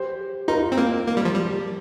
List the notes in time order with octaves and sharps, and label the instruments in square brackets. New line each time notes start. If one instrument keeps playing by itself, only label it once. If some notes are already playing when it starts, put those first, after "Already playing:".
Already playing: [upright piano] G4 C5
[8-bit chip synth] D#4 [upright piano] F4 A#4
[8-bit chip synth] C4
A#3
A#3
G3
F3
G3